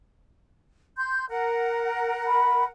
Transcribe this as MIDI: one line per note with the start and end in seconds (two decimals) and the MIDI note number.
0.97 1.25 84
0.97 1.25 91
1.28 2.68 70
1.28 2.68 78
2.27 2.64 83